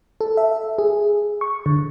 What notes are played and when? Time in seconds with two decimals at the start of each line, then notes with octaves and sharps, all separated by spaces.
0.21 A4
0.37 E5
0.78 G#4
1.41 C#6
1.66 D3